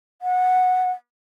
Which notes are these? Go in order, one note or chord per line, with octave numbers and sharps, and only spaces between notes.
F#5